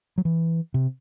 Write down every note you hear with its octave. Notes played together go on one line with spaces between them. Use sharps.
F#3
E3
C3